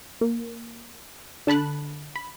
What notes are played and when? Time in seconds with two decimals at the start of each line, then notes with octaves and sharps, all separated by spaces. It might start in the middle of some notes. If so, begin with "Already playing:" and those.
0.21 A#3
1.47 D3 A5 B5 F#6
2.16 B5